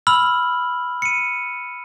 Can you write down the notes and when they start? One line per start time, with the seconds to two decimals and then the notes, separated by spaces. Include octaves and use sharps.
0.07 B5 E6 F6 F#7
1.02 C#7 D#7